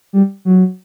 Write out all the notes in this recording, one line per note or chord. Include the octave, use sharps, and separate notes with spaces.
G3
F#3